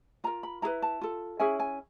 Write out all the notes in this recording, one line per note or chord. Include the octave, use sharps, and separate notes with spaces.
F4 A#4 A#5
B5
E4 G#4 B4 A#5
A5
F4 A4
C#4 E4 G#4 G#5
G#5